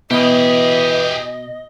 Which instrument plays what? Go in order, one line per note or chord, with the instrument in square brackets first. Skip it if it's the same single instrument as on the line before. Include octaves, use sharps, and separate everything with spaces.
[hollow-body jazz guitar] B2 [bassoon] E3 [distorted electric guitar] G4 G#4 [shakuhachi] D#5